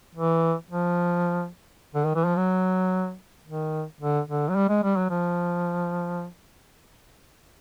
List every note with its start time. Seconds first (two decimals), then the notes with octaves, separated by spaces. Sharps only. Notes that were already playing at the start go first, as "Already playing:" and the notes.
0.15 E3
0.70 F3
1.95 D3
2.05 D#3
2.15 E3
2.26 F3
2.36 F#3
3.45 D#3
4.00 D3
4.28 D3
4.49 F#3
4.55 G3
4.69 G#3
4.84 G3
4.97 F#3
5.10 F3